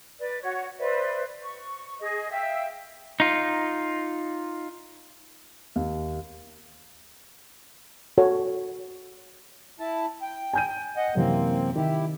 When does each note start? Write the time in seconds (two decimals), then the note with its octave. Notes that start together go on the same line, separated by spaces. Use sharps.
0.19 B4 D5
0.42 F#4 C#5
0.79 B4 C5 D5 E5
1.43 C#6
2.00 G#4 D#5
2.31 E5 F5 G5
3.20 D#4 F4
5.76 D#2
8.18 F#4 A4 C#5
9.80 E4 A5
10.22 G5
10.53 G#5 G6 D#7
10.97 D#5 F#5
11.15 F#2 C3 E3 A#3 C4
11.76 D#3 E4 G4